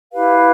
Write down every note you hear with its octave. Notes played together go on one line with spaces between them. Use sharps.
E4 G4 B4 F5